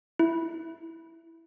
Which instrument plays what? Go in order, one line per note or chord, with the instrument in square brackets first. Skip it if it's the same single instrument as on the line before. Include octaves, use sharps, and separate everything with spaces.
[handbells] E4